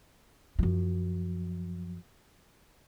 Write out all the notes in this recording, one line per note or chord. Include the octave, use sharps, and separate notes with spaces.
F#2 F3